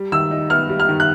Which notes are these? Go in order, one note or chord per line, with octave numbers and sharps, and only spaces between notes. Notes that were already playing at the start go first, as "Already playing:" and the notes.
Already playing: G3
D#3 E6
D#4
B3 F6
G3
F6
D#3
F#6